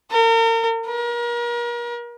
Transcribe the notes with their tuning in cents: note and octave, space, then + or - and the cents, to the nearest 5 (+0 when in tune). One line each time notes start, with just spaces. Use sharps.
A#4 -40
A#4 +35